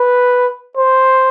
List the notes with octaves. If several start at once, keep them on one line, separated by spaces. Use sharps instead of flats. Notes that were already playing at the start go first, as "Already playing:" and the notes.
Already playing: B4
C5